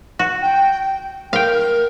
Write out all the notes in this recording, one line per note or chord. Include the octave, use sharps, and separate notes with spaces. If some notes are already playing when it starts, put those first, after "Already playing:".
F#4
G5
A#4 F5 G5